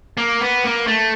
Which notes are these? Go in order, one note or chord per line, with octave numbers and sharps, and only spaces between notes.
A#3
B3
A#3
A3